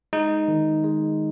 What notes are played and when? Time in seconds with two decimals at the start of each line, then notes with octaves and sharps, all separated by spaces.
0.13 G#3 D#4
0.48 D#3
0.84 G#3